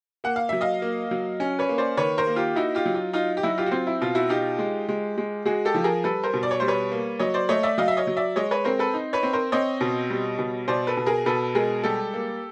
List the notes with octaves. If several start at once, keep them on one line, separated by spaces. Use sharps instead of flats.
A#3 F#5
F5
F#3 E5
D#5 F5
A#3
F#3
C#4
B4 C#5
A#3
C5 D5
D#3 B4 C#5
A#4 C5
A#3
F4 G4
D#4 E4 F#4
F4 G4
F#3
F4
D#4 F4
G4
F#3 E4 F#4
F4 G4
F#4
C4 F4
E4
B2 F4
E4 F#4
D#4 F4 G4
G#3
G#3
G#3
G#3 F#4 G#4
G4 A4
F3
G#4 A#4
G3 A4 B4
A#4 C5
B2
D5
C#5
G3 C5
B4 C#5
A#3
F#3 C#5 D#5
C5 D5
A3 C#5 D#5
D5 E5
F#3 D#5 F5
E5
C#5 D#5
F#3
D5 E5
G#3 C#5 D#5
B4 C#5
C4 A#4 C5
A4 B4
D#4
B4 C#5
C4
A#4 C5
C4 C#5 D#5
B2
G3
B2
B2 C5 D5
A4 B4
B2
G#4 A#4
B2 A4 B4
G#3 G#4 A#4
G3 G4 A4
A#3